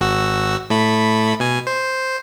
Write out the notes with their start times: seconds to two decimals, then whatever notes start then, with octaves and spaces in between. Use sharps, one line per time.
0.01 G#1 F#4 E6
0.70 A2 A3 B5
1.40 B2 G#5
1.67 C5